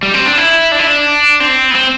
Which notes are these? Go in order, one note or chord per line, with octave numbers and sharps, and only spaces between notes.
G3
C4
D4
E4
D4
E4
D4
C4
B3
C4